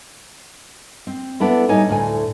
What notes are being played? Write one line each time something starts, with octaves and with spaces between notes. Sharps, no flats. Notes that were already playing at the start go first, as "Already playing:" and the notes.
C4
B3 D4 E4 A4
A2 G3 D#4 C#5 G#5
D2 A2 G#5